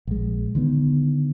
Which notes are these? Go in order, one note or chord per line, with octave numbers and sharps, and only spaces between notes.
A#1 G#3
D3 D#3 B3